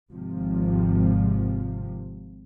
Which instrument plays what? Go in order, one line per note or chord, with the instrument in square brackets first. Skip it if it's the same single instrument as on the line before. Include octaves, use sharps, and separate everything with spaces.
[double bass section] G#1 C3 F3